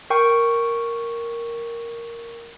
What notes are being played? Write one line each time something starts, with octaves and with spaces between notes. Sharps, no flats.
A#4 G5 C#6